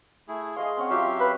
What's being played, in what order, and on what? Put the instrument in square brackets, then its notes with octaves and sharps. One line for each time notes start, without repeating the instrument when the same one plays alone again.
[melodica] A3 E4 G#4
[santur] G#4 D#5 F5 [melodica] C6
[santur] C4 C#4 F#5
[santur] F#3 F4 [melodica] G4 E5 F5
[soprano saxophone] B4